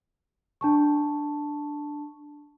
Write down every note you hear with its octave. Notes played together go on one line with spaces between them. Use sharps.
D4 A5 C#6